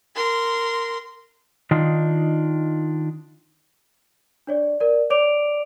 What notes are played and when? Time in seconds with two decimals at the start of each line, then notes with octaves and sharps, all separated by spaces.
0.16 A#4 C6
1.71 D#3 D4 D#4 F4
4.47 D4 C#5 D5
4.80 A#4 D5
5.10 C#5 D5 D6 D7 F7